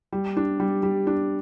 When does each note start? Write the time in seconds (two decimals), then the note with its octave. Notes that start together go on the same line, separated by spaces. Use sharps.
0.12 G3
0.37 D4
0.60 G3
0.83 G3
1.07 D4